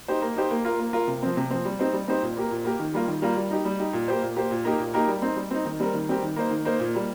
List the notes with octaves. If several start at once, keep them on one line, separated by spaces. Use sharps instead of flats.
D#4 G4 C5
A#3
D#4 G4 C5
A#3
F4 A#4
A#3
F4 A#4
C3
F3 C4
C3
F3 C4
G3
C4 D#4 G4 C5
G3
C4 D#4 G4 C5
A#2
A#3 G4 A#4
A#2
A#3 G4 A#4
D#3
G3 A#3 F4 A#4
D#3
G3 A#3 F4 A#4
G3
D#4 G4
G3
D#4 G4
A#2
A#3 G4 C5
A#2
A#3 G4 C5
A#2
A#3 D#4 G4 A#4
A#2
A#3 D#4 G4 A#4
G3
C4 D#4
G3
C4 D#4
D#3
G3 C4 G4 A#4
D#3
G3 C4 G4 A#4
D#3
A#3 D#4 C5
D#3
A#3 D#4 C5
A#2
G3 A#3